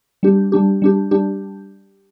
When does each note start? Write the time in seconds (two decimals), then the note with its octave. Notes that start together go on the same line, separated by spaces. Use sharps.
0.23 G3 D4 G4
0.52 G3 D4 G4
0.82 G3 D4 G4
1.11 G3 D4 G4